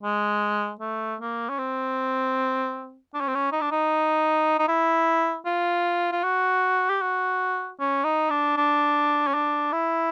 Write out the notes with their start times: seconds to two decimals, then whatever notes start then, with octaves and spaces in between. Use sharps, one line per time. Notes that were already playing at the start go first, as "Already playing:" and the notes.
0.03 G#3
0.81 A3
1.21 A#3
1.49 C#4
1.59 C4
3.14 D4
3.21 C#4
3.28 C4
3.35 C#4
3.52 D#4
3.61 D4
3.71 D#4
4.59 D#4
4.68 E4
5.46 F4
6.12 F4
6.24 F#4
6.90 G4
7.02 F#4
7.80 C#4
8.04 D#4
8.30 D4
8.57 D4
9.28 C#4
9.34 D4
9.72 E4